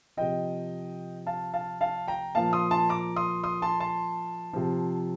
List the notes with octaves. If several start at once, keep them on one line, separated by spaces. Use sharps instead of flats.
C3 F3 D#5 G5
F5 A5
F5 A5
F5 A5
G5 A#5
A#2 F3 F5 A5
C6 D#6
A5 C6
A#5 D6
C6 D#6
C6 D#6
A5 C6
A5 C6
C3 F3